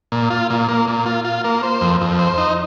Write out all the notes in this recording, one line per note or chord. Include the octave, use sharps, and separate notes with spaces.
A#2
F4
A#2
A#3
A#2
F4
F4
A#3
C5
F2
F2
C5
D#4